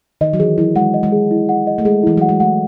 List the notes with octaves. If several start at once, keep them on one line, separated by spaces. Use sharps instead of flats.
D#3 D#5
F#3
E3 G#4
F#3 E4
G#3 F#5
D#5
G#3
G#4
E4
F#5
D#5
A3
G#3 G#4
E3 E4
F#3 F#5
G#3
A3 F#5